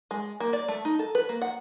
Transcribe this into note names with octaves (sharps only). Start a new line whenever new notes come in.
G#3
A#3
D5
A3
D#4
A4
B4
A#3
F#5